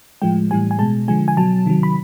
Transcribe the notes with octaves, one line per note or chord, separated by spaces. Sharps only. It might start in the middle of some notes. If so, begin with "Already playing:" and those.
A2 F3 G#3 G5
A2 E3 G3 G#5
G#5
B2 G#3 A5
D3 F3 G#3 G#5
G#5
B2 F#3 A5
C3 D#3 F#3
B5